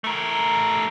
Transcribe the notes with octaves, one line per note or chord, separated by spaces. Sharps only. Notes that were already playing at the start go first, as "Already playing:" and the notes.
A3 A#4